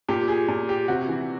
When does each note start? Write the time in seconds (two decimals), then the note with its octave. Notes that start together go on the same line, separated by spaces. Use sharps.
0.08 A#2 G4
0.28 G#4
0.48 A#2
0.69 G4
0.88 C3 F#4
1.08 E3